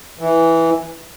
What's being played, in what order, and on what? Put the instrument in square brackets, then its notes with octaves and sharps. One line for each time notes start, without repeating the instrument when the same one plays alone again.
[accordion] E3